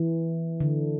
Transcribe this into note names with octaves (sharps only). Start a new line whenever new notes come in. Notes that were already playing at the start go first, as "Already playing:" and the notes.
Already playing: E3
D3